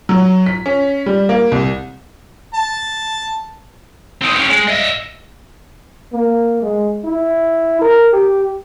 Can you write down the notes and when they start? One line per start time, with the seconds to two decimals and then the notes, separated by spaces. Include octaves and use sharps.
0.09 F#3
0.46 B6
0.66 C#4
1.06 G3
1.29 A#3
1.52 C2
2.54 A5
4.22 C4 D#4
4.36 C#4 G4
4.49 G#3
4.68 D#5 E5
6.13 A#3
6.63 G#3
7.05 E4
7.82 A#4
8.13 G4